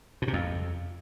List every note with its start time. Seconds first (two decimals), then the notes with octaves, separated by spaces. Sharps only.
0.22 B2
0.28 C3
0.33 F2